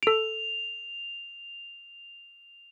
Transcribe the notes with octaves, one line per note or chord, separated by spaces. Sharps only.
A4 D7 F7